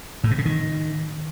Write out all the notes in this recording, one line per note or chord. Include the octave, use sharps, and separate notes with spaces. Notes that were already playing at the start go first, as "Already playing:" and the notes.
A2
C3
C#3
D#3